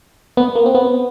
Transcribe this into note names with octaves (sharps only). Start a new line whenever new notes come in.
B3
A#3
C4
B3